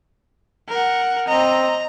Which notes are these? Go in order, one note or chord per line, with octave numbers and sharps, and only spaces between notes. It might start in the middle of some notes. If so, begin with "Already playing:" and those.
A#4 F#5
C4 D#5 A#5